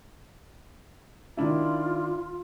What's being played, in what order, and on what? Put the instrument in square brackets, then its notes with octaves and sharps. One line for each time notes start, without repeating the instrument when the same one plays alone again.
[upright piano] D#3 D4 E4 [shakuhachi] F4